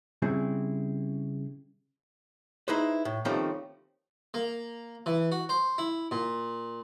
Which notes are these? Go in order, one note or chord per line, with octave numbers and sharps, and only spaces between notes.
C#3 G3 C4 E4 G#4
D#4 E4 G#4 B4 C5
A2
D#3 F3 G3 A3 C4 C#4
A#3
E3
F#4
C5
E4
A#2